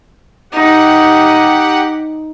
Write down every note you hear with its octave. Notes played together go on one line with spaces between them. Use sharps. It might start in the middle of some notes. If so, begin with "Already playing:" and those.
D#4 G4 F#5